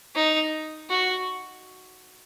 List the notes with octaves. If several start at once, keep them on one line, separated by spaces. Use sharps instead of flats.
D#4
F#4